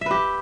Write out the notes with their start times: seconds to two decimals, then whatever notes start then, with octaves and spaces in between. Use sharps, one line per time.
0.01 E5
0.06 B4
0.11 G4